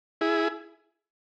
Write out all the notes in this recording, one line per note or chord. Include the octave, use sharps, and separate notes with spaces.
E4 G#4